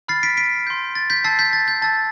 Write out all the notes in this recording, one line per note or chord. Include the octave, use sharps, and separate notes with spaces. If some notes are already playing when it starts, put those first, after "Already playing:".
B5 F6 A6 C7
B6 D7
B6 D7
C6 G6
A6
G6 B6
A5 E6 G6 A6 C7
G6 B6
A6
G6
A5 E6 G6 A6